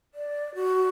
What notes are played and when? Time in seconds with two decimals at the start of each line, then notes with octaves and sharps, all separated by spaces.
0.14 D5
0.55 F#4